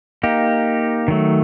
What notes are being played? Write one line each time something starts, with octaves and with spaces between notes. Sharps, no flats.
A#3 D#4 G4
D#3 F#3 A3